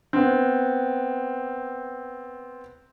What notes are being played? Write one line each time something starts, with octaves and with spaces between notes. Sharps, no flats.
B3 C4